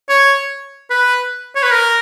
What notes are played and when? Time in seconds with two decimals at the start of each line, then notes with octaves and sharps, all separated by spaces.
0.09 C#5
0.90 B4
1.55 C#5
1.63 B4
1.71 A#4